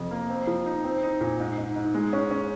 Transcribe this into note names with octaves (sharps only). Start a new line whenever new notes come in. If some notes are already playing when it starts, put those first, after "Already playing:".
Already playing: F2 C3
A#3
C4
F3
D#4
C4
D#4
A#2
G#2
G#2
G#2
G#3
C#4
C#4